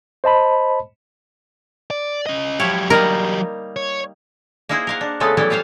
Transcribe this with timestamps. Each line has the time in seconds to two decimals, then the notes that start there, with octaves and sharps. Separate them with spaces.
0.24 C5 D#5 A5 B5
1.91 D5
2.27 C#4 D#5
2.60 F3 F#3 E4 G4 C#5
2.90 G3 A#3 D#4 A#4
3.76 C#5
4.69 A#3 D#4 E4 G#4 C5
4.87 A#4 F5 F#5
5.01 D4
5.20 C#3 G#3 A3 B3 A4
5.37 E3 F#3 G3 A3 B3 E4
5.50 F4 G4 C5 C#5 F5